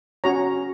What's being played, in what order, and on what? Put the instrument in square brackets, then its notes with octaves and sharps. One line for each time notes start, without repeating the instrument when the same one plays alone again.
[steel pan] C#4 F#4 C#5 A#5